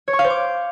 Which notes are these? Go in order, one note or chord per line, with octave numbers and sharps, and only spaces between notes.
C#5
C#6
F5
C5
D6